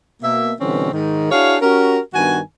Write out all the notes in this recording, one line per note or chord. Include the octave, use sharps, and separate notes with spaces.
B2 A#3 E5
B2 D3 E3 G3 C4 C#4
G#2 D#3
D4 E4 F#4 G#4 C#5 F5
C#4 F#4 G4 A#4
G2 D#3 B3 F#4 G#5